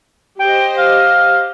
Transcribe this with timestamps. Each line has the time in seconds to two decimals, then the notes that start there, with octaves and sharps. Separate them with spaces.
0.40 G4 C5 D#5 G5
0.78 F5